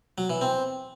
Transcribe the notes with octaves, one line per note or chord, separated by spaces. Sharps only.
F#3
E3
C4